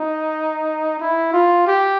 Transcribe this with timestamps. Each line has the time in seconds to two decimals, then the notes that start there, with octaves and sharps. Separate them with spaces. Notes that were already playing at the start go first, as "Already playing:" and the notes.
Already playing: D#4
1.00 E4
1.33 F4
1.67 G4